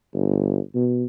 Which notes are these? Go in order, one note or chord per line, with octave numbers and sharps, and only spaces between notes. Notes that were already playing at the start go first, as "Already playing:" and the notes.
G1
B2